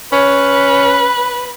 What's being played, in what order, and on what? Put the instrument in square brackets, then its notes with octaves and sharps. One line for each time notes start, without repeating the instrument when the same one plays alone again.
[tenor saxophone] C#4 [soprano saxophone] B4